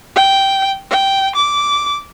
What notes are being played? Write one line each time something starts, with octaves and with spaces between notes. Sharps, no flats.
G5
G5
D6